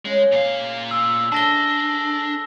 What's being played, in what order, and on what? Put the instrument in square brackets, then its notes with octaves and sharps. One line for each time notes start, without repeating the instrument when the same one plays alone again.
[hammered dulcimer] C#3 [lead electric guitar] G#3
[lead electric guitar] A#2 F5
[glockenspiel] E6
[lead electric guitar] D4 [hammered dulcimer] A4 E5 [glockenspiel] A5 A#6 G7